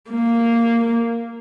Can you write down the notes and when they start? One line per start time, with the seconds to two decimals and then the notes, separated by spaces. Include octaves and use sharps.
0.11 A#3